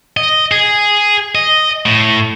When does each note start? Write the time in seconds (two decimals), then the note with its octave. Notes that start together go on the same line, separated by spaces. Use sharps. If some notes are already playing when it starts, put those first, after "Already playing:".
0.17 D#5
0.51 G#4
1.35 D#5
1.86 A2